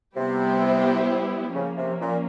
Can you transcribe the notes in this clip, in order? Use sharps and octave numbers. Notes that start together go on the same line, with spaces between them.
C3 G3 B3 E4 G4 C5
C#3 F3 A#3 C#4
C3
A#2